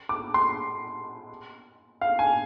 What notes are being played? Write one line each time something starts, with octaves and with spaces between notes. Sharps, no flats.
D6
C6
F5
G#5